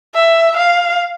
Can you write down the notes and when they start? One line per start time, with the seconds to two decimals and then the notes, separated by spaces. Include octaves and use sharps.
0.15 E5
0.57 F5